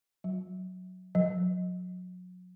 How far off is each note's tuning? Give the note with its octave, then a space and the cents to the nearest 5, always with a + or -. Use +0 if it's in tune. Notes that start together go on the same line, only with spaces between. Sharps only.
F#3 -5
F#3 -30